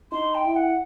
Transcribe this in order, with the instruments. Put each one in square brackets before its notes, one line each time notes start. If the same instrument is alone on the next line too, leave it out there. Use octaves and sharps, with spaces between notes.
[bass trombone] D#4 [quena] C6
[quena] G5
[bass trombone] E4
[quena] F#5